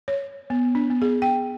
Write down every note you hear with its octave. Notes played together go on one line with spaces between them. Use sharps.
C#5
B3
D4
B3
G#4
G5